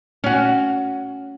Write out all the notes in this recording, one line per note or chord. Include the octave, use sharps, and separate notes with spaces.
C#4 F#4